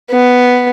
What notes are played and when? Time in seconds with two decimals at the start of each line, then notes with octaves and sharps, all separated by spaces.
0.11 B3